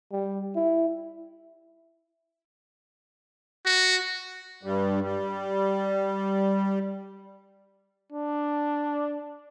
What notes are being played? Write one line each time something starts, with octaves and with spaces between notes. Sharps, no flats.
G3
E4
F#4
G2 G3
G3
D4